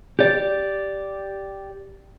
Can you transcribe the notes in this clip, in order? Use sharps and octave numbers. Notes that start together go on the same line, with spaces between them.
G4 D5